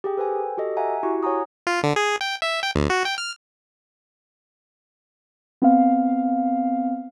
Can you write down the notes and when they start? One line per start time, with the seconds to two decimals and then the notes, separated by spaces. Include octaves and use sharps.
0.04 G4 G#4 G5
0.17 A4 B4 C5 G5 G#5
0.57 F#4 G4 A4 D#5
0.77 E5 F#5 G#5 A#5
1.03 E4 F#4 G4 C#6
1.23 C#5 F#5 G#5 A#5 D#6
1.67 F4
1.83 D3
1.96 G#4
2.21 G5
2.42 E5
2.63 G5
2.75 D2
2.90 F#4
3.05 G5
3.18 F6
5.62 B3 C4 F5